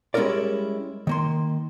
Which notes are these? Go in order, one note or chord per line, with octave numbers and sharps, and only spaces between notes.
G3 G#3 C#4 E4 A#4 D5
D#3 A#3 C6